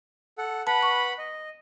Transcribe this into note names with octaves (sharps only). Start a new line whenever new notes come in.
A4 F#5
B4 F#5 A5 B5
C#6
D#5